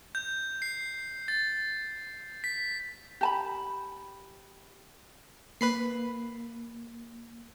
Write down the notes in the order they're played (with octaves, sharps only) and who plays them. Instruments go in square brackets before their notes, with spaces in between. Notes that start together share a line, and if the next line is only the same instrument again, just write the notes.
[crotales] G6
C7
A6
B6
[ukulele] G4 A5 B5
[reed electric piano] A#3 [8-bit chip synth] B4 B5 C7